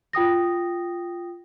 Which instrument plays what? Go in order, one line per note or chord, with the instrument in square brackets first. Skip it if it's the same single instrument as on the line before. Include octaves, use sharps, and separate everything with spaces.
[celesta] F4 G5 D#6 A#6